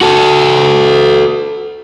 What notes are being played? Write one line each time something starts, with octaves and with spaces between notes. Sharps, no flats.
F#4 A4